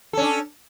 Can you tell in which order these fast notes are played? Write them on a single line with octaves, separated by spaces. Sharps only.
A4 C#4 D4